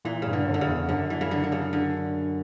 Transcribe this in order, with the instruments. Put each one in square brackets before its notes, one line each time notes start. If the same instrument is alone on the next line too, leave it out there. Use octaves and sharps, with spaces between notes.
[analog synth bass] A#2 [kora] E3
[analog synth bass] G2 [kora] C#3
[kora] D3
[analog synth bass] F#2
[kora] D3
C#3
[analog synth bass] E2
[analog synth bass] F#2 [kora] D3
[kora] E3
C#3
D3
D3
C#3
D3